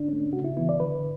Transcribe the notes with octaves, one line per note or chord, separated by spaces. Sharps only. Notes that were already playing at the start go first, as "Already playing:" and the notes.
Already playing: D3 D4
A3 C#4
C#3 F#4
E4
E3 B3 E4
D5
D3 B4